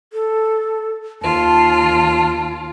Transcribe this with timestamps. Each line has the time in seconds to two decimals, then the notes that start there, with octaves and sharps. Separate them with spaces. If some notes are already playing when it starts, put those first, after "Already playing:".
0.13 A4
1.22 D#2 F4 A5